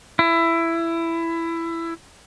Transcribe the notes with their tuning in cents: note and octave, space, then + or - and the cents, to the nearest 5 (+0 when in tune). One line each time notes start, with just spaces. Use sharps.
E4 +15